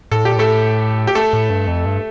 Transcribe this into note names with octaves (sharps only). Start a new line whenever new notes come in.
A2 A4
A#2 G4
A2 A3 A4
G4
A3 A4
A2
G2
F2
G2